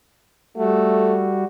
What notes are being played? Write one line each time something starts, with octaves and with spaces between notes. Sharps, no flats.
G3 A3 F#4